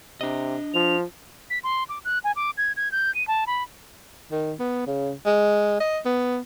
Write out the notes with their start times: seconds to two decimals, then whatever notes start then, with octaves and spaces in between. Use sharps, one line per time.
0.21 C3 D4 D#5
0.74 F3 F7
1.50 B6
1.64 C6
1.89 D6
2.05 F#6
2.24 G#5
2.36 D6
2.57 G#6
2.77 G#6
2.92 G6
3.15 D#7
3.28 A5
3.47 B5
4.32 D#3
4.60 B3
4.87 C#3
5.26 G#3
5.80 D#5
6.06 B3